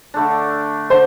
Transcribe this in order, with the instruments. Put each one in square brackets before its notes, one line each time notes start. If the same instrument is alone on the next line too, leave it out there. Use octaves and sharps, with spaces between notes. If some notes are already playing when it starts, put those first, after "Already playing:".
[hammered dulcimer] D3 A3 D4
[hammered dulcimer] D3 [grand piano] C5